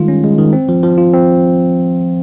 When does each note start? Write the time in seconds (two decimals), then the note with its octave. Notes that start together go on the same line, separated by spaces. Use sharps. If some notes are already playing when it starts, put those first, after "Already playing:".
Already playing: D#3 G3 G#3 F4
0.08 C#4
0.24 G#3
0.38 D#3
0.53 C4
0.69 F3
0.83 F3
0.98 F4
1.13 C4